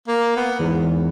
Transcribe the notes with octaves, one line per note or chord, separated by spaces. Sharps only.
A#3
B3
E2 G#2